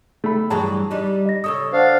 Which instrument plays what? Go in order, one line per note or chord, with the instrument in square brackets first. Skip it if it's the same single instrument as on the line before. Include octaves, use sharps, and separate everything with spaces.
[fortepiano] A3 B5
[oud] G2 E3 F#3 [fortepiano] G#4 A5 A#5
[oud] G3 D4 D#4
[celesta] D#5 A#6
[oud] C#3 A4 C#5 [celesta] D#6 E6
[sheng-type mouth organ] D4 F5 [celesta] C5 F#5